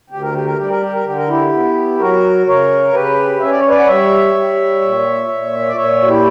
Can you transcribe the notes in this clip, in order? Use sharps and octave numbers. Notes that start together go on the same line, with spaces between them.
D2 G4
A#4
G4
A#4
G3 G4
A#4
G4
A#4
D3 G4
A#4
E4 G4
B3
F#3 F#4 A#4
C#3 A#4 C#5
C#3 G4 B4
C#4 E5
D5
C#5
B4 D5
F#5
G3 C#5 E5
G3
A#2
A#2
C#5
D5
A#2 C#5 E5
F#4
E4 G4